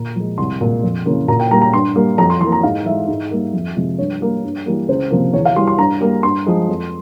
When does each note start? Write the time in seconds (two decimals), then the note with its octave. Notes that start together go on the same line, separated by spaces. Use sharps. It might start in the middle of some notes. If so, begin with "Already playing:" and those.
Already playing: A#2 A#5
0.16 F3 G#3
0.38 C2 C6
0.61 A#2 G#3
0.83 F2
1.06 C#3 E3 A#3
1.28 A#2 A#5
1.40 G5
1.51 G3 A#3 A#5
1.62 A#5
1.73 G2 C6
1.96 G3 A#3
2.18 F2 A#5
2.30 C6
2.41 E3 C6
2.45 A#3
2.52 A#5
2.63 G#2 F5
2.85 E3 G#3 E5
3.08 G#2
3.31 G3 A#3
3.53 F2
3.76 C3 F3 G#3
3.98 G2 C#5
4.21 G3 A#3
4.44 G2
4.66 E3 G3 A#3
4.88 C#2 C5
5.11 C3 F3 A#3
5.33 E2 C#5
5.45 F5
5.56 E3 G3 C6
5.67 C6
5.78 G2 A#5
6.01 G3 A#3
6.23 G2 C6
6.46 F3 G#3
6.68 F2